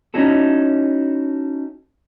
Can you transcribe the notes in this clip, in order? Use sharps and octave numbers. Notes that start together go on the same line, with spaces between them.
C#4 D#4 E4 F#4 A4